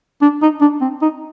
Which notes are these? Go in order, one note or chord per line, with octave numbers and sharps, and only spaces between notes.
D4
D#4
D4
C4
D#4